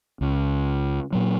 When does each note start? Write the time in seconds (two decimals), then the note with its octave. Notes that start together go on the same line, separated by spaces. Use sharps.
0.21 C#2
1.12 A#2 F#3